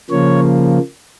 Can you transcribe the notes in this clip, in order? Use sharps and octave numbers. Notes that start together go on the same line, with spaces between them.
C#3 F3 A#3 C#5